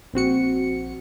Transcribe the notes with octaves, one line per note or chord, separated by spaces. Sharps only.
A#1 C4 F#4 C#7